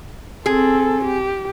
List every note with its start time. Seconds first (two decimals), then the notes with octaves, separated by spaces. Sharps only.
0.46 C4 G#4 A4
1.05 G4